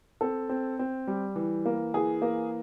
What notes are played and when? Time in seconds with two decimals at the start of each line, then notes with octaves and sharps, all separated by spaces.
0.21 C4 A4
0.49 C4
0.79 C4
1.07 G3
1.36 E3
1.66 A#3
1.94 E3 G#4
2.22 A#3